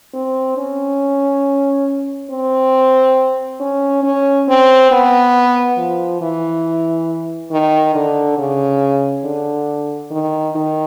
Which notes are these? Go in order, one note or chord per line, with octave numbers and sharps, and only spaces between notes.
C4
C#4
C4
C#4
C#4
C4
B3
F3
E3
D#3
D3
C#3
D3
D#3
D#3